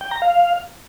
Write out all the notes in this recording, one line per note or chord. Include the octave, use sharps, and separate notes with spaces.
G5
A#5
F5